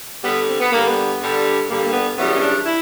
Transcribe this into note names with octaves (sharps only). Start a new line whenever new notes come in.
G2 D3 G3 B3
C4
B3
G2 D3 G3 A#3
B3
G2 D3 G3
G2 D3 G3 A#3
A#3
B3
F#2 C#3 E3 G3 B3
C#4
D4
E4